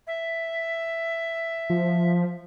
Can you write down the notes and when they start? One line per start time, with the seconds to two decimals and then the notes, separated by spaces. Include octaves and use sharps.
0.07 E5
1.70 F3